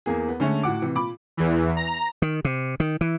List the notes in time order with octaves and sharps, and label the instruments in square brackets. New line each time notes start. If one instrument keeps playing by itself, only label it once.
[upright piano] E2 A#3 G#4
B3
D3 G#3 A3 C#4
A2 F#4 F#5 D6
C3 E3
A#2 B5 D6
[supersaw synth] E2 E3
A#5
[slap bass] D#3
C3
D#3
E3